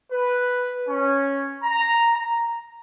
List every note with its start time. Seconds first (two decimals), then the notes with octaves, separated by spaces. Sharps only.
0.11 B4
0.87 C#4
1.63 A#5
2.16 A#5